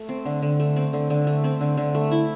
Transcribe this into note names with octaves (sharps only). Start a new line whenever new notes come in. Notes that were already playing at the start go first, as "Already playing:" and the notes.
Already playing: A3
C4
D3
D3
A3
C4
D3
D3
A3
C4
D3
D3
A3
E4